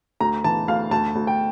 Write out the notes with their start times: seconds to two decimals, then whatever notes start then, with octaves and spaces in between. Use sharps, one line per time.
0.20 D2 A#5
0.44 E3 A5
0.68 D2 F5
0.91 D2 A5
1.15 D2
1.27 G5